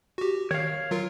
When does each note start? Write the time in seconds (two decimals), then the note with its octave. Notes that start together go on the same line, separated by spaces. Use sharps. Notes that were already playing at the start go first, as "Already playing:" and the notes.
0.18 F#4 G4
0.51 D#3 C#5 F5
0.91 F#3 F4 A#4